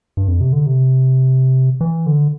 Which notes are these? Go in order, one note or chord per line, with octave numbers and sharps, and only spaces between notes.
G2
F2
C3
D3
C3
E3
D3